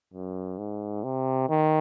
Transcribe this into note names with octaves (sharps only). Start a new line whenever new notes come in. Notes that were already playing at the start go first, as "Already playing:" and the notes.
F#2
G#2
C3
D#3